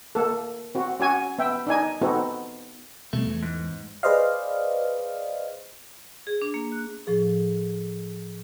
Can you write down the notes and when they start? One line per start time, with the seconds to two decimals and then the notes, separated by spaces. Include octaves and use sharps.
0.15 A#3 A4
0.75 C4 F#4
1.00 C#4 F#4 G#5
1.38 B3 E5 G5
1.67 D4 D#4 G#5
2.01 B3 C4 D#4 F#4 A4
3.13 B2 G3 A3 C4
3.24 E2 E3
3.43 G#2
4.03 G#4 B4 C5 D5 D#5 F5
6.27 G#4
6.42 D4
6.54 A#3
6.72 F#6
7.07 A2 F3 G#4